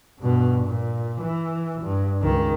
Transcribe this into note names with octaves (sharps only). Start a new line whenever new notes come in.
G2 B2
A#2
E3
G2
C#2 D#3